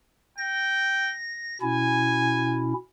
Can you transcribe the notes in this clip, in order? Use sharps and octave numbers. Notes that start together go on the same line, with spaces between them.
G5 A#6
B2 C#4 E4 G#5